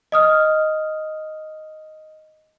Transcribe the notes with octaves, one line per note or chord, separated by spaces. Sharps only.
D#5 D#6 F6